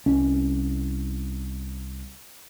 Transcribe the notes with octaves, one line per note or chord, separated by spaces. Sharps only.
C2 C#4